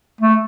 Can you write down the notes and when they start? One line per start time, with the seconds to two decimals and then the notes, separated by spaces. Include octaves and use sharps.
0.21 A3